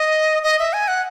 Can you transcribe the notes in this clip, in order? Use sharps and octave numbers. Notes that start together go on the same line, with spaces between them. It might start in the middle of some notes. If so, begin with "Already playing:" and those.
Already playing: D#5
D#5
E5
G#5
F#5